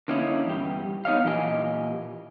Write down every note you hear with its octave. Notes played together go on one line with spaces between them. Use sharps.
D3 A#3 C#4 D#4 E4
E2 G2 G4
B3 D#4 C#5 D#5 F5
A#2 E3 G4 A#4 D#5 G#5